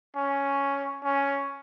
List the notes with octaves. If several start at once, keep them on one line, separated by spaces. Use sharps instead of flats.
C#4
C#4